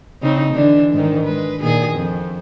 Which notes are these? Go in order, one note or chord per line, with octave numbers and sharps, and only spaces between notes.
C#3 C4 D#4
D3 E3 D4
G#2 D#3
G#3 B4
A#2 D#3 G#4
F2